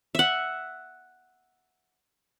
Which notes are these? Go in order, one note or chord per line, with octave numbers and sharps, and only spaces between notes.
E5 F#5